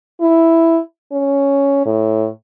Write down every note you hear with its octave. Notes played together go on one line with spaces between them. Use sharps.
E4
C#4
A2